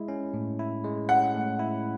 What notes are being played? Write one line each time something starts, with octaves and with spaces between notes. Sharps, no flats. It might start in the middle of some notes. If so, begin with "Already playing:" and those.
Already playing: G#3 E4
C#4
A2
E4
G#3
C#4 F#5
A2
E4